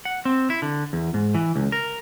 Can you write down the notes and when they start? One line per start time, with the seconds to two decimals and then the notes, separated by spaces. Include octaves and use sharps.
0.05 F#5
0.25 C4
0.50 E4
0.62 D3
0.93 E2
1.14 G#2
1.34 E3
1.56 C#2
1.72 A#4